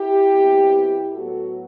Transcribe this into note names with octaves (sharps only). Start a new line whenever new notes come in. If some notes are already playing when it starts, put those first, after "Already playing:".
Already playing: E4 G4
B2 G3 C4
A2 F#3 B3 F#4 A4